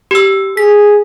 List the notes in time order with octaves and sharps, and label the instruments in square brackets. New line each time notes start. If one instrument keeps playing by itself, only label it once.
[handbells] G4 E6
[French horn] G#4 [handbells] B6